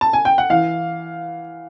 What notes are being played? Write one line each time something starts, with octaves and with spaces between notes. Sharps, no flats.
A5
G#5
G5
F#5
E3 F5